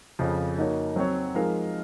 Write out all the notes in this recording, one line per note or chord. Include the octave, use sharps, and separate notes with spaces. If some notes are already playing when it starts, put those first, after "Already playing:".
F2 C#3 F3
A#3 D#4 F#4 C#5
F#3 C4 F#4 C#5
F3 G#3 D#4 A#4 F5